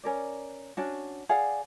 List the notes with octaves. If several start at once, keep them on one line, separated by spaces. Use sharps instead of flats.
C#4 A#4 D5
C#4 D4 F#4
G#4 D5 F5 F#5